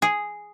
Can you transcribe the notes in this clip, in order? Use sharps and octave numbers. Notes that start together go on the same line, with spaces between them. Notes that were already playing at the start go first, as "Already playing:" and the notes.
G#4